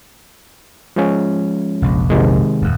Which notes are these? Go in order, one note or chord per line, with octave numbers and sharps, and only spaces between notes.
F3 G#3 C#4
F1 A#1
C3 D#3 G#3
D1 F2